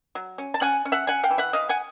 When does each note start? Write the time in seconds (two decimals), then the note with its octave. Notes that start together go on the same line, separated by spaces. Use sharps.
0.15 F#3
0.38 C#4
0.54 A5
0.61 C#4 F#5 G#5
0.85 C#4
0.92 E5 F#5
1.07 C#4 F#5 G#5
1.24 F5 G5
1.31 E3
1.38 E5 F#5
1.53 E3 D#5 F5
1.69 F#5 G#5